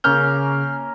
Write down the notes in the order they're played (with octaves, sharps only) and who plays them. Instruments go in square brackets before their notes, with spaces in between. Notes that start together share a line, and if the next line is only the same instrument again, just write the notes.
[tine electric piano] C#3 G6 [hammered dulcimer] A#3 C#4 [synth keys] F6